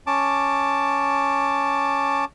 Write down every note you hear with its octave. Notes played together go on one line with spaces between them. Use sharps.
C#4 A5 D6